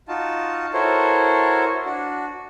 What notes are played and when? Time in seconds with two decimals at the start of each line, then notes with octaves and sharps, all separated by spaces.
0.08 D#4 F4 F#4 A5
0.73 E4 F#4 A4 A#4 C5 C#5
1.85 D4 F#4